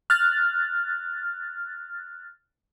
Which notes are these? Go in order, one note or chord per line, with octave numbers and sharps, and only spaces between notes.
F6 F#6 A6